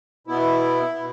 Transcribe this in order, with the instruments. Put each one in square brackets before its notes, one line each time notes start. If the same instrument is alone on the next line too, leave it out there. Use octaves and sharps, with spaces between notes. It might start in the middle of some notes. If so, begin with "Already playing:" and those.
[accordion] B2 B3 E4
B2 B3